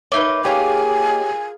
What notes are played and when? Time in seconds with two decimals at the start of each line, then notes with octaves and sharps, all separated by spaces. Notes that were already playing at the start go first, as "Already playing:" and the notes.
0.12 A#3 D#4 B4 C#5 E5
0.45 F4 G4 G#4 A#4 C#5 G#5